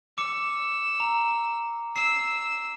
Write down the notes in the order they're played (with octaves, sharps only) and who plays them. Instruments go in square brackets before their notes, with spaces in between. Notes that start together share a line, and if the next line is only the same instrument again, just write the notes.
[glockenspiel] D6 C#7 [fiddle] E6
[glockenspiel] A#5
[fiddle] E6 [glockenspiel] C7